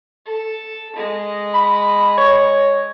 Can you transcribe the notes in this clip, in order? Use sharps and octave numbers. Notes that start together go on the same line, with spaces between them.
A4
G#3 D#5
B5
C#5